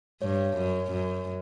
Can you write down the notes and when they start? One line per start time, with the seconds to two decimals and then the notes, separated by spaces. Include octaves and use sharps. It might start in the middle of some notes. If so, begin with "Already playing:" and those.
0.22 G2 C#5
0.57 F#2
0.92 F#2